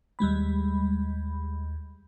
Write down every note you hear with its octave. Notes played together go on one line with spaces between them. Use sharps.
D#2 G3 G#3 B5